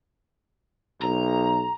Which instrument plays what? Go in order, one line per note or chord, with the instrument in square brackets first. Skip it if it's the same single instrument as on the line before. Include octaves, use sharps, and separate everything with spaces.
[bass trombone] B1 [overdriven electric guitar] A#5